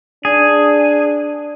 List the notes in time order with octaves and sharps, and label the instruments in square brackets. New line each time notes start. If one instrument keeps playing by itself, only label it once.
[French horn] D4 [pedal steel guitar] G#4